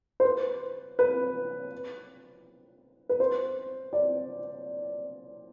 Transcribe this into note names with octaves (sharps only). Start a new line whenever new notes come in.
C5
B4
B4
B4
C5
D5